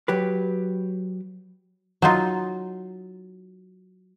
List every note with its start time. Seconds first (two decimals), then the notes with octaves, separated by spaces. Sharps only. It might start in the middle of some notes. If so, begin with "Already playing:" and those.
0.08 F#3 G4 B4
2.02 F#3 D#4 F4